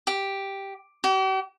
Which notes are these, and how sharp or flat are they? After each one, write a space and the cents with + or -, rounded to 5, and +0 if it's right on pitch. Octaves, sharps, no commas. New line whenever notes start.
G4 +0
G4 -45